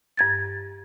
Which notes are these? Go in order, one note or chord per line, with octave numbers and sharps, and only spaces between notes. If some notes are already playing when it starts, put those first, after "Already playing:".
G2 G#6 A6